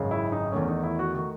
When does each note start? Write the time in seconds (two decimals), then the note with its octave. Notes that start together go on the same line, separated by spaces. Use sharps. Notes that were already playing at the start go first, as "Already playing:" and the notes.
Already playing: G#1 F#2 C#3 G#3
0.11 E4
0.32 D#4
0.52 E2 D#3 A3 C#4
0.68 D#4
0.84 E4
0.99 F#4
1.15 D#3 A3 F#4